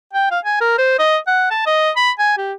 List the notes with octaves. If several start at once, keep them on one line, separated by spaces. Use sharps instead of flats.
G5
F5
G#5
A#4
C5
D#5
F#5
A5
D#5
B5
G#5
G4